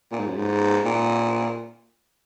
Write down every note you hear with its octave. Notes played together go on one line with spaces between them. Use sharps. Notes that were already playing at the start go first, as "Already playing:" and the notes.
A#2
G#2
F#2
G#2
A#2